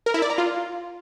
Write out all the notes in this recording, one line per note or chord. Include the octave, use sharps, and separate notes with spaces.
A#4
E4
D5
A#5
F4